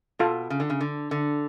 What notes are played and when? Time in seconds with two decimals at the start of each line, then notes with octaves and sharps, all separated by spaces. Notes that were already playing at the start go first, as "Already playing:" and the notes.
0.19 B2 F4 A4 F5
0.50 C#3
0.60 D3
0.70 C#3
0.81 D3
1.11 D3